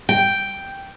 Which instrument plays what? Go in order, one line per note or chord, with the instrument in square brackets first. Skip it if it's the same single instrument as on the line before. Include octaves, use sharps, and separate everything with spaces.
[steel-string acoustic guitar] G5